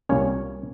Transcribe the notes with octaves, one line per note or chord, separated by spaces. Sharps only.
C2 A#2 G3 A#3 C#4 C#5